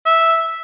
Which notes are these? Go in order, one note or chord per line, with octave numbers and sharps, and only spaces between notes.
E5